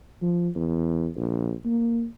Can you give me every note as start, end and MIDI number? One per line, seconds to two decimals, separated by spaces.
0.22 0.49 53
0.56 1.08 40
1.16 1.52 34
1.65 2.06 58